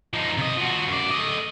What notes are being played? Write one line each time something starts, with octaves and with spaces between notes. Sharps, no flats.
F3 D#4
C3 D#5
F3 F#4
F#2 D5
A3 D#5